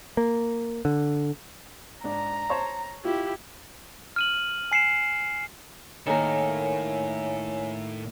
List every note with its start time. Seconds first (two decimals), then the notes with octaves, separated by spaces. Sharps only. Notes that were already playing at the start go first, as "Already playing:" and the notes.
0.17 A#3
0.85 D3
2.04 G#2 D4 A#5
2.49 C5 C#5 A5
3.05 E4 F4 G4
4.16 F6 D#7 F#7
4.72 G#5 C7 C#7 E7
6.07 A2 D#3 A#3 A4 C#5 G#5